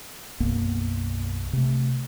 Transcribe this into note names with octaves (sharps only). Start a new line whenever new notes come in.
B1 F#2 A#3 B3
C3 A3